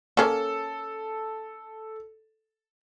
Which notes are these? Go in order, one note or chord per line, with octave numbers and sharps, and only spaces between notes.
A#3 C#4 A4